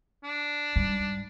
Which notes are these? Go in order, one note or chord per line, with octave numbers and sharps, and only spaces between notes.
D4
G#2 G3